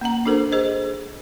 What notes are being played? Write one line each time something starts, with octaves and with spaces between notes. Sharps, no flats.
A#3 C#4 F#5 A#5
D4 F#4 A4 A#4 C5
G#4 C5 D#5